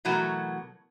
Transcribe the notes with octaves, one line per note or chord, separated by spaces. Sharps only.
B2 E3 F#3 A3 F#4 A#4